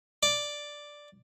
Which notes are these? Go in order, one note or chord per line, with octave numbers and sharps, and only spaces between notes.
D5